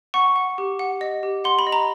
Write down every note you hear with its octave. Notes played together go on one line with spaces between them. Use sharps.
F#5 C#6
F#5
G4
F#5
D#5
G4
F#5 C6
B5
D#5
A#5